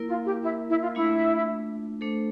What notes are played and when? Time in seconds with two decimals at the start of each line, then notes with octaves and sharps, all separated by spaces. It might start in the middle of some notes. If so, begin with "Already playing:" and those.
Already playing: A#3 E4 A#4
0.08 F4
0.25 G4
0.43 E4
0.70 E4
0.82 F4
0.95 A3 D4 E4 F4
2.01 A3 D4 A4 C5